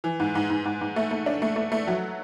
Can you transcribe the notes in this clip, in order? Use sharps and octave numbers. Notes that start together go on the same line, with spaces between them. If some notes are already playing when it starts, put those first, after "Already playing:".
E3
G#2
G#2
G#2
G#2
G#2
A3
A3
D4
A3
A3
A3
F#3